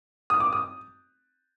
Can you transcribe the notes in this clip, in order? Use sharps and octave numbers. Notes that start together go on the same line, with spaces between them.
D#6
D6
D#6